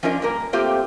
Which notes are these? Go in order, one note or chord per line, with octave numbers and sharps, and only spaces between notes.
F3 C#4 D4 F4 A#4 D#5
G2 A#3 A#4
A3 A#3 C4 F4 G4